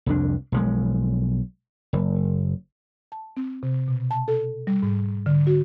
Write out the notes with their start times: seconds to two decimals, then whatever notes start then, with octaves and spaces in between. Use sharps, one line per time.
0.06 C2 F2 D4
0.52 B1 F3 G#3
1.93 F#1
3.12 A5
3.37 C4
3.63 C3
3.88 B2
4.11 A5
4.28 A4
4.67 G3
4.83 G#2
5.26 D3
5.47 F#4